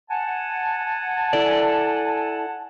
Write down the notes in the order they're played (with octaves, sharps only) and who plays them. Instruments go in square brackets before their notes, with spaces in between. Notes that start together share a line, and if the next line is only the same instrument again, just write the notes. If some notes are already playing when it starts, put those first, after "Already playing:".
[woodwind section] F#5 G#5 A5
[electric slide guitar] E4 A4 D5